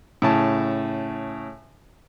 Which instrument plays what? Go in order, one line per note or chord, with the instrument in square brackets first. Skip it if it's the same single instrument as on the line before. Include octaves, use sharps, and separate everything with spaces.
[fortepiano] A2 C#3 A5